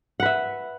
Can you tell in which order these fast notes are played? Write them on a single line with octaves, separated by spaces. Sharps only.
F#5 B4 E5